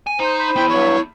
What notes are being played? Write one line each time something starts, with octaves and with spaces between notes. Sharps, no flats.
G#5
D#4 C5 A#5
B5
B3 E4 G5
G2 F#3 C#5